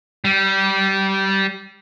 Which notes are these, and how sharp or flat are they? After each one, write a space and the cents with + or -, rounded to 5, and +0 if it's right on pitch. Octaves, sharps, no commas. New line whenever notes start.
G3 -20